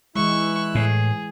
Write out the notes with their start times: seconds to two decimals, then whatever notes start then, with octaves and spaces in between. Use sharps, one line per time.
0.15 E3 G#3 E4 C#6 E6 F#6
0.75 A2 G#4